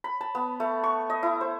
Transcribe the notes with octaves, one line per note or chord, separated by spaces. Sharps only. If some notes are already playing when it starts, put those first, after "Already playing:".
B5
A5
B3
A3
C#6
D#5
E4
C5